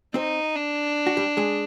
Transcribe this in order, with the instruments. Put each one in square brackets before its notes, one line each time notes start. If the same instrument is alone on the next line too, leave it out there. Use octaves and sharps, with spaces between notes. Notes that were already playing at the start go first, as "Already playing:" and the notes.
[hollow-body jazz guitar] C4 C5 [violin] D#4
[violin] D4
[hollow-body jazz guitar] F#4
G3 G4
G#3 G#4